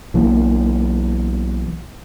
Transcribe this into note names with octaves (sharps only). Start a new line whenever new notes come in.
B1 E3 A#3